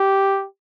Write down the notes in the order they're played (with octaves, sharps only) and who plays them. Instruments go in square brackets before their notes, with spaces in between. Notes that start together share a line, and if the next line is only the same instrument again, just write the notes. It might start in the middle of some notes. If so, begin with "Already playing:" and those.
Already playing: [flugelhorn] G4